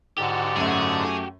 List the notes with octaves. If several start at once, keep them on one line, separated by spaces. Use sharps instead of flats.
G#2 D3 F#4 G4 A5
F#2 A3 G#4